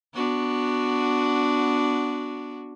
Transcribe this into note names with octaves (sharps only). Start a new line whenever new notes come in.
B3 D4 F#4